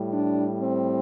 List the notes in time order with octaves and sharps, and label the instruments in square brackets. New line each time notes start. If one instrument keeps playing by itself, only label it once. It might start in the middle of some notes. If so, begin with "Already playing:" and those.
Already playing: [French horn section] A2 G3
D4
C4